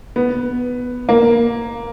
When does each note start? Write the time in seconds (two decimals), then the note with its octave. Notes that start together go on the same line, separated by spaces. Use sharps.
0.16 B3
1.09 A#3